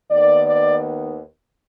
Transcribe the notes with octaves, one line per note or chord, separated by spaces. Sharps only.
D#2 D#3 B3 D5
D5